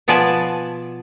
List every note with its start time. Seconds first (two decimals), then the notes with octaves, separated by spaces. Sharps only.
0.08 B2 F3 B3 D5 G#5 A5